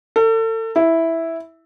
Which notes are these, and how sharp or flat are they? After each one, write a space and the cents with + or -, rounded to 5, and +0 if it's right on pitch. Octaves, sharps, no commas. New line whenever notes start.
A4 +35
E4 -5